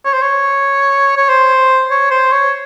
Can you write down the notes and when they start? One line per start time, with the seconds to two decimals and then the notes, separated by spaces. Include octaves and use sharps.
0.05 C#5
0.13 C5
0.22 C#5
1.17 C#5
1.29 C5
1.91 C#5
2.11 C5
2.32 C#5